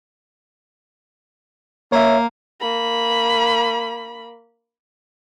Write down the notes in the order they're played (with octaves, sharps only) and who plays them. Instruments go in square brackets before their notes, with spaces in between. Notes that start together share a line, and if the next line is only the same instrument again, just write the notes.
[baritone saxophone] A#3 [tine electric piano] C#5 E5
[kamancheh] A#3 B5